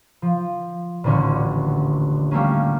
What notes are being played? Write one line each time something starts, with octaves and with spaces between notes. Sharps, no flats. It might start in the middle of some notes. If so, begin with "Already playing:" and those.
F3
D#1 A1 D3 C#4 F#4
G3 A3 A#3 C#4